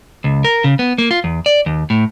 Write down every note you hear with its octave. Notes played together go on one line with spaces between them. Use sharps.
C#2
A#4
C#3
B3
A#3
F4
E2
D5
D#2
A2